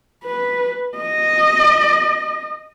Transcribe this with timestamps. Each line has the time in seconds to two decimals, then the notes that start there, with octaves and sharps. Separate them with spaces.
0.23 B4
0.97 D#5